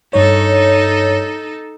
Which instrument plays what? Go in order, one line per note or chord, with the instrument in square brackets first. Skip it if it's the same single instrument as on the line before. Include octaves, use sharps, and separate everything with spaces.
[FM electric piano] G2 C#5 [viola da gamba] D#4 A4